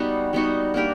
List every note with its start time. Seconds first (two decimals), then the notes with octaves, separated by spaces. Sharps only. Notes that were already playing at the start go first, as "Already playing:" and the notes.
Already playing: G3 B3 D#4 F#4
0.33 G3 B3 D#4 F#4
0.74 A#3 D4 G4 A#4